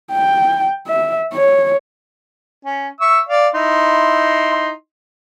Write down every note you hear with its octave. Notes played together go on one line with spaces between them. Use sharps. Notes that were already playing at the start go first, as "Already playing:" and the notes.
G5
E5
C#5
C#4
E5 C#6 E6
D5 F5
D#4 E4 C6